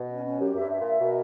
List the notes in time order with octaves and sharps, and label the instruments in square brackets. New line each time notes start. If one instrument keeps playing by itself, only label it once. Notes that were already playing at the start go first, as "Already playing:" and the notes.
Already playing: [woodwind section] B2
[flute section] C#4
C#4
[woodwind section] F#2 [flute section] G4
[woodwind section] F#2 [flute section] E5
[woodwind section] G2
[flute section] E5
[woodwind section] A#2
[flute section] E5
[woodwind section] B2 [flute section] A#4